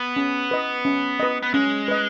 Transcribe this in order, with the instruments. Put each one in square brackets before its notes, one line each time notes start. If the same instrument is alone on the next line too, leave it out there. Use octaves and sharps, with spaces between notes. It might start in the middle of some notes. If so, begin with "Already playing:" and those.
Already playing: [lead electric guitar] B3
[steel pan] C#4
B4 D#5
C#4
B4 D#5
[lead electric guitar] B3
[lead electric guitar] G#3 [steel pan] C#4
[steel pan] B4 D#5